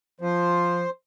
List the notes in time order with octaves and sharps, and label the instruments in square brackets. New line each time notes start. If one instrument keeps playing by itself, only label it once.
[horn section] F3 [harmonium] C5